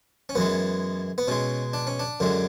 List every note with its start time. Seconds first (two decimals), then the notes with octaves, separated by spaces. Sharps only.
0.29 C#4
0.35 F#2 E3 G#3 B3
1.18 B3
1.28 B2 G#3 C#4
1.74 D4
1.87 C#4
2.00 D4
2.20 F#2 D3 G#3